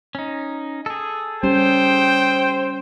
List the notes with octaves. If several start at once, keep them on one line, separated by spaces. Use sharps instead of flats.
C#4 D#4
G#4 A4
G3 C#4 G4 C5 G5